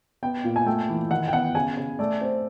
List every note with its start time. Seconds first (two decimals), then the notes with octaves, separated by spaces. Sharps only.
0.23 B3 G5
0.45 A#2
0.56 G#5
0.66 A3 G5
0.89 E3
1.11 D#3 F#5
1.28 G5
1.33 B3 F#5
1.55 C#3 G#5
1.77 C#3
1.99 A3 D5
2.21 C4